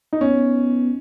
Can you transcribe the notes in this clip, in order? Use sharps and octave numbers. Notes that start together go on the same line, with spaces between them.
D#4
B3 C#4